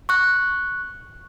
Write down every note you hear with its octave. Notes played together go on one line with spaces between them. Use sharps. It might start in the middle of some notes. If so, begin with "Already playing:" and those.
C#6 F#6